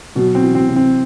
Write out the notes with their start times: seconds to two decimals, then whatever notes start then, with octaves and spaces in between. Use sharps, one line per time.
0.15 B2 F#3
0.35 C4
0.42 E3
0.55 C4
0.69 C3
0.76 C4